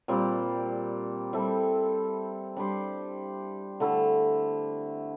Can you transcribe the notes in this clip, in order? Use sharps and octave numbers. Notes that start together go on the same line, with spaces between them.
A#2 G3 C4
G3 C4 E4 A4
G3 D4 G4 C5
D3 A3 E4